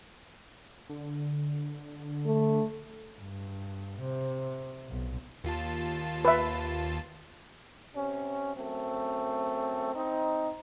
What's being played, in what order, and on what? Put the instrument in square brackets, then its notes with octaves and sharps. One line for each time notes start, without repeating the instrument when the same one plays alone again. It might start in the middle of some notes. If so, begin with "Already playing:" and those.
[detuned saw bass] D3
[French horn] A3
[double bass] G2
C3
B1
[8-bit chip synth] D#2 F4 A5
[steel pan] B4 E5
[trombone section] C3 C#4
F#2 A3 C4
C4 D#4